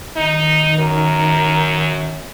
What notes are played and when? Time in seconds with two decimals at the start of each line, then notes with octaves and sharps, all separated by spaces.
0.16 D#3 D#4
0.78 F#2 A#4